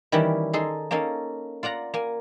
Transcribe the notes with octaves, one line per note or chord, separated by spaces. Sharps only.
D#3 E3 G3 C#4 E4 G4
D#4 G#4 A4 C6
A#3 C#4 D#4 A4 F5
F4 D5 F#5 A#5
A#3 G#5